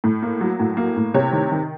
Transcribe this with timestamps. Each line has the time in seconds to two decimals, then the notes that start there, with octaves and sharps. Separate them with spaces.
0.04 A2
0.22 A#3
0.41 F#3
0.60 A2
0.77 A#3
0.97 A2
1.14 C3 C#5
1.32 D#3
1.52 D#3